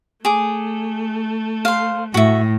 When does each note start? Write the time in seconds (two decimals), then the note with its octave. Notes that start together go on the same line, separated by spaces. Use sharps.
0.25 A3 G#4 D6
1.65 C5 F5
2.14 A2 F#4 E5